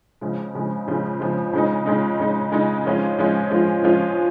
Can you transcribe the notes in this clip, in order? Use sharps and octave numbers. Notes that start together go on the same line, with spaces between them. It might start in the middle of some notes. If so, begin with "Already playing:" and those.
C#3 F3 G#3
C#3 F3 G#3
C#3 F3 G#3
C#3 F3 G#3
C#3 G#3 D#4
C#3 G#3 D#4
C#3 G#3 D#4
C#3 G#3 D#4
F3 G#3 C#4 F4
F3 G#3 C#4 F4
F3 G#3 C#4 F4
F3 G#3 C#4 F4